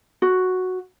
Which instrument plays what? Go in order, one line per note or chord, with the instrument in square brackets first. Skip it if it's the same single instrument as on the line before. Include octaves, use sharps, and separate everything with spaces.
[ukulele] F#4